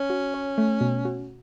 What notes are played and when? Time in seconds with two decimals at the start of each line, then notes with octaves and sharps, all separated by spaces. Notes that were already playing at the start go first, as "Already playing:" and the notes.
Already playing: C#4 C#5
0.10 F#4
0.34 C#5
0.58 A3
0.81 B2
1.05 F#4